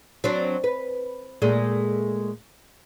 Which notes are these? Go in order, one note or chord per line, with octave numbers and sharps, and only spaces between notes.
F#3 C4 D4
B4
A#2 G#3 A3